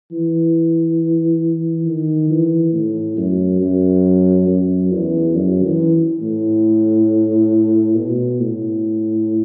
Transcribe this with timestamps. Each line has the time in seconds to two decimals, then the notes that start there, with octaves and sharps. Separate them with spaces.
0.11 E3
1.86 D#3
2.30 E3
2.73 A2
3.17 F#2
3.60 F#2
4.47 F#2
4.91 E2
5.34 F#2
5.64 E3
6.22 A2
7.97 B2
8.40 A2